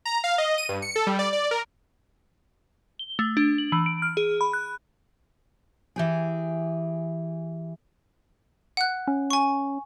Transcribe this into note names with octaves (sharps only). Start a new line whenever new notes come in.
A#5
F5
D#5
D#7
G2
C#7
A4
G3
D5
D5
A#4
G7
A3
D4
F#7
E3
D7
F6
G#4
B5
F#6
E3 G4 G#4
F#5 F#6
C#4
G#5 C#6